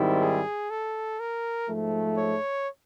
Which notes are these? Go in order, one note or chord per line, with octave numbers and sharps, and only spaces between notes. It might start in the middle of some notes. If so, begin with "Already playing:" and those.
Already playing: G#2 D#3 G3 C4 E4
G#4
A4
A#4
G#2 F3 A3
C#5